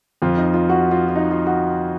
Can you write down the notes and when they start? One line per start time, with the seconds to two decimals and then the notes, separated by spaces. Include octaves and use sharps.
0.22 F2 F3 F4
0.38 D#4
0.54 F4
0.69 F#4
0.91 F4
1.09 F4
1.16 D#4
1.31 F4
1.47 F#4